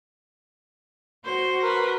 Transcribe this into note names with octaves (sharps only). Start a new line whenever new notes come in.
F#4 C5
A#4 B4